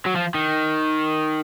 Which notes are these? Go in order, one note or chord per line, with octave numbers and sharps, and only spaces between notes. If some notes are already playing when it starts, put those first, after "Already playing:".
F#3
F3
D#3